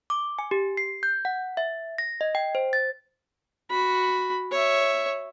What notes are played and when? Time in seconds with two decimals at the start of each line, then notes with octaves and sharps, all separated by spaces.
0.10 D6
0.39 G#5
0.51 G4
0.77 C7
1.03 G6
1.25 F#5
1.57 E5
1.98 A#6
2.21 D#5
2.35 G5
2.55 C5
2.73 A6
3.71 F#4 B5
4.52 C#5 E5